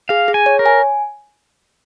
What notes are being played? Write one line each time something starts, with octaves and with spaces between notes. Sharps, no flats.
G#4 F5
G#4
G#5
C#5
A#4
G#5